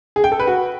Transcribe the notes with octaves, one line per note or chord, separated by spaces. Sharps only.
G#4
G5
A4
B4
F#4